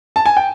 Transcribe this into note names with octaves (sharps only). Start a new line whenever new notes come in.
A5
G#5
G5